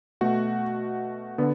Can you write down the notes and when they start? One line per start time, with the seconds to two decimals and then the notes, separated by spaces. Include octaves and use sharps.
0.21 B2 A3 F#4
1.38 D3 B3